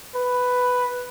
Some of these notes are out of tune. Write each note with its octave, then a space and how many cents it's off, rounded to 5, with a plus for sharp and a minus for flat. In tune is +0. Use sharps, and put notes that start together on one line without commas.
B4 +5